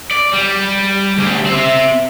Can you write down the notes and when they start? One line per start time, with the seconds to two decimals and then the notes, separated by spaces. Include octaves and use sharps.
0.11 D5
0.33 G3
1.18 D2 G3
1.46 C4 E5